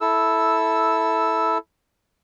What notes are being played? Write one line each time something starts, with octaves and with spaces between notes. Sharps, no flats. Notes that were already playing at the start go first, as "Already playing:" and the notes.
E4 A4 E6